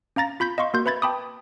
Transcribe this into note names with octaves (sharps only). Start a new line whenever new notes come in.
C#4 F5 A#5 A6 A#6
F4 B5 G6 B6
D#5 F5 C6 C#6
A#3 F#4 A#4 C6 G6
B4 E5 B5 G#6 A6
G5 A5 B5 D6 D#6